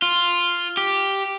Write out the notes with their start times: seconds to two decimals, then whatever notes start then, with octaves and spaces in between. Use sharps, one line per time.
0.02 F4
0.77 G4